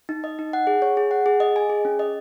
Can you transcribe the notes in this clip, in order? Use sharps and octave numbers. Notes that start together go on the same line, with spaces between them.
D#4
D#5
D#4
F#5
G#4
C#5
G#4
F#5
G#4
D#5
G#5
G#4
C#4
D#5